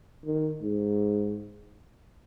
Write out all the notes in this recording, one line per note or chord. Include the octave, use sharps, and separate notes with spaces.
D#3
G#2